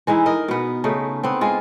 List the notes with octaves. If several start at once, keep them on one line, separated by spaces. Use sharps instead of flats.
E3 G#3 D#4 E4
A#4 D#5
B2 B3
C#3 A3 D#4
B3 C4
G#3 F4